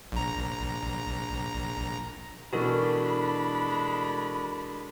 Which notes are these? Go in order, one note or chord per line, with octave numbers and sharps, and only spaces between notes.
A#1 A#5
B2 E3 G#3 D4 F#4 A4 A#4 B5